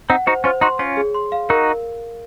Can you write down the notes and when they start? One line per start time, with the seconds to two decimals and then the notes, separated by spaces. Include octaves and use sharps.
0.10 C4 D#4 F#5
0.27 D#4 F#4 C5
0.44 C#4 F4 C5
0.61 D#4 F#4 C6
0.79 C#4 F4 C#5
0.97 G#4
1.14 C6
1.32 F5
1.49 D#4 F#4 A#4